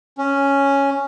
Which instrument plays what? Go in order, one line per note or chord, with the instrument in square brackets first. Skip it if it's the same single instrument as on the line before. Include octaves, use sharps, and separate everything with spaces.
[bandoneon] C#4